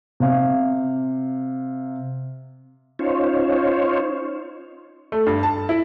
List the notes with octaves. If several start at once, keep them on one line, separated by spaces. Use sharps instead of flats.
C3 F5
C#4 D#4 F4 C5 C#5
A3
G2
A5
E4